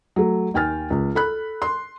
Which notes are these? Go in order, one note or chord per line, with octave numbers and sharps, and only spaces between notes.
F#3 A3
D#2 G5 G#5 F6 A6
C#2
A4 B5 F#6
C6